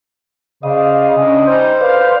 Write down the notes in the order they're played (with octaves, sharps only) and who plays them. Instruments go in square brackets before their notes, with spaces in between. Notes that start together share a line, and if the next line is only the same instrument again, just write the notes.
[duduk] C#3 [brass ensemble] C5 D5 F5 [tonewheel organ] D#5
[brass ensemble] A2 C3 D4 [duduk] C#4
[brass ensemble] G3 C#4 D#4 [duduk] C5
[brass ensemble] D3 F5 [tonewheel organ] B4 D5